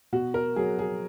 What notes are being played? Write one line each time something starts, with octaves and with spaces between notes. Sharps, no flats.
B2 F#4
A#4
F#3 G#4
G#4